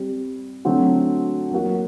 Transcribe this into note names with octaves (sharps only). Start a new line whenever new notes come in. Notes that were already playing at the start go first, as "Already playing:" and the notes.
Already playing: G3 C4 G4
D3 F#3 A3 C4 F#4
F#3 A#3 F#4